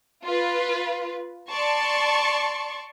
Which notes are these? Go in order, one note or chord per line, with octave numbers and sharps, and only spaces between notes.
F4 B4
D5 A5 C6 C#6